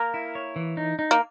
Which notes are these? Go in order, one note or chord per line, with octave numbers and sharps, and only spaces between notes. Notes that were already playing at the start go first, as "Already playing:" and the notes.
Already playing: A#3 A#4
E4
C#5
E3
D#4
D#4
A#3